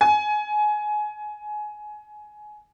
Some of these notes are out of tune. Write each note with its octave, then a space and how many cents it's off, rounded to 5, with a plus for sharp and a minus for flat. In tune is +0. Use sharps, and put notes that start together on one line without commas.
G#5 +20